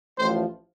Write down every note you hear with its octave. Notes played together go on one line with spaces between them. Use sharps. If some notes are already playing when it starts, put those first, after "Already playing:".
A1 A2 F3 C5